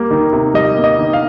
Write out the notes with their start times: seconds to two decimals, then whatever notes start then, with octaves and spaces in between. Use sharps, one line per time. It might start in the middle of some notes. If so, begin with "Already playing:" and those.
Already playing: G3 A#3
0.11 D#3
0.33 C3
0.54 G3 D#5
0.77 A#3
0.84 D#5
0.99 D#3
1.13 F5